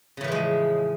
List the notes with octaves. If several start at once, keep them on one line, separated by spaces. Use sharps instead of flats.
A2 C#3 E3 F3 G#3